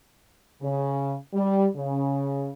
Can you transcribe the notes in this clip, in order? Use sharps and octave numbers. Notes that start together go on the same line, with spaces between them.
C#3
G3
C#3